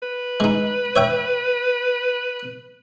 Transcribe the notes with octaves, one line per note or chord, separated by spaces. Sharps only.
B4
G#3 D#4
C#5 E5 G5